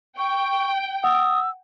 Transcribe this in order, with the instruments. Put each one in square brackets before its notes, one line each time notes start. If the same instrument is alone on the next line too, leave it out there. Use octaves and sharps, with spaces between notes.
[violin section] G5 [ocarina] C#6
[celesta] F#5 [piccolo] D#6 [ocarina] E6